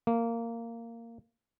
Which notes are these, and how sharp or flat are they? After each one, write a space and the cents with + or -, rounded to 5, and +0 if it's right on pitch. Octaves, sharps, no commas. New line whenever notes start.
A#3 -15